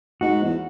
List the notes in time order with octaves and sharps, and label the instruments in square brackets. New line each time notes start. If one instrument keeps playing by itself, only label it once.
[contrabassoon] G#2 [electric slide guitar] F#4
[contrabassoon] E2